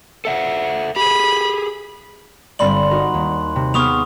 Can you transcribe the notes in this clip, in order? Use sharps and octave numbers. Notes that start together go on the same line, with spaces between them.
A4 E5 F#5
G4 G#4 B5
G1 C4 D5 B5 C6 F#7
D#4 F#4 A#4
D#2
C3
B3 G#4 C#6 D#6 F6 F7